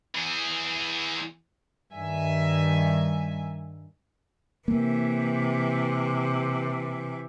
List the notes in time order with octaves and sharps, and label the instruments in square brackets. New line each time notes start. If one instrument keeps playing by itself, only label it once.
[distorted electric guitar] E3 G#4
[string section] G2 D#3 E5 G#5
[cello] C3 E3 [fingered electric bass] A#3